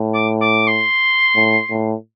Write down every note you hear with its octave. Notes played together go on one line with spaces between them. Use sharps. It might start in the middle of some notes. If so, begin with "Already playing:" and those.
Already playing: A2
D6
D6
C6
A2
A2